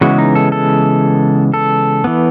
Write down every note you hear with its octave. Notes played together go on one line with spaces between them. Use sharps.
C#3 E3 G#3 B3 F#4
D#4
A4
A4
A4
E3 B3